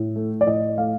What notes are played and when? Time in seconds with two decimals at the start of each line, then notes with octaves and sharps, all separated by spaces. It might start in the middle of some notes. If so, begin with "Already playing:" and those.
Already playing: A2
0.16 A3
0.41 D5
0.46 A2 D#5
0.78 A3 F5